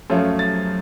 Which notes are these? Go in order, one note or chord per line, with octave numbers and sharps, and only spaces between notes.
F#2 F3 A3 C#4 F4
A6